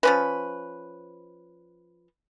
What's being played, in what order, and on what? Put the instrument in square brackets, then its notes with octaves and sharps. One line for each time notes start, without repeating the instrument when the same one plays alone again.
[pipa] F3 C#4 B4